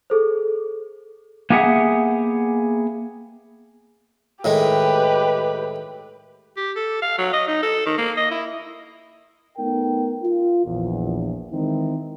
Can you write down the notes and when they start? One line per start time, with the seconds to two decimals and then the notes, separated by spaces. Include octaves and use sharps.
0.10 G#4 A4 C5
1.50 A#3 B3 G4 G#4 E5 F#5
4.44 A2 D#3 G#3 G4 B4
6.57 G4
6.76 A4
7.02 F5
7.18 F#3
7.33 D#5
7.47 D#4
7.63 A4
7.86 D#3
7.98 A#3
8.17 D#5
8.31 E4
9.57 A3 B3 D#4 A#4 G5
10.23 F4
10.66 A#1 E2
11.52 D#3 E3 G#3 C4 D#4 E4